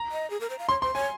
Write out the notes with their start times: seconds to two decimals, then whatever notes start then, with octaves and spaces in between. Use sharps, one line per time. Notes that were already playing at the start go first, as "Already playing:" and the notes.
Already playing: A#5
0.12 D#5
0.30 G#4
0.41 A#4
0.50 C5
0.59 F5
0.69 C#5 C6
0.82 C5 C6
0.95 C#5 G#5